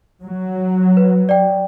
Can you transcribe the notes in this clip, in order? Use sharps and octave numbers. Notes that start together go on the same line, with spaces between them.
F#3
B4
D5 G5